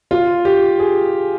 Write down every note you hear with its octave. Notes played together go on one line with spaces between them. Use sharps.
F4
G4
G#4